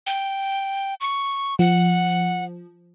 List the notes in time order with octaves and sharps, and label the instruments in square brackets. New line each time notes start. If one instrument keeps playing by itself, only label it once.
[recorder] G5
C#6
[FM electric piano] F3 [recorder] F#5